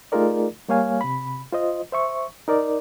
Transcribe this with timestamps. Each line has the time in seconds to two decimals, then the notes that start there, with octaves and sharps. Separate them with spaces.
0.12 A3 D#4 F4 G#4 A#4 D5
0.69 G3 A#3 C#5 F5 G#5
1.01 C3 B5
1.53 F4 C5 D#5
1.92 C5 E5 C#6
2.48 D#4 A#4 D5